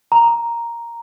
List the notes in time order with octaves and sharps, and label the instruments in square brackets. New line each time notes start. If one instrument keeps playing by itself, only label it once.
[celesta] A#5